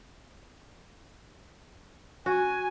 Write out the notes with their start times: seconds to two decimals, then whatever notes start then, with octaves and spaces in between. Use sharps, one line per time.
2.26 F#4 G#5